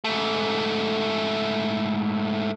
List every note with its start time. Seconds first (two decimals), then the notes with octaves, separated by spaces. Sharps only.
0.04 G#2 A3